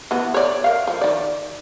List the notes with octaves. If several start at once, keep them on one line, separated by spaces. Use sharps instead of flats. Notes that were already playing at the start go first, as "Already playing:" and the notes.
E3 B3
C#5 D5
A#4 F5
F3
D#3 D5